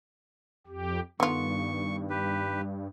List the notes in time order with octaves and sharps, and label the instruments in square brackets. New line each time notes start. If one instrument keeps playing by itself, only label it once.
[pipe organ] F2 G4
[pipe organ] G2 [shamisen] D3 F4 [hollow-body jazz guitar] D#3 B3 [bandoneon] C#6
[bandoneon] G4 B4